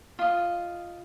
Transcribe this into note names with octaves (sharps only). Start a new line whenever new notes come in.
F4 D#5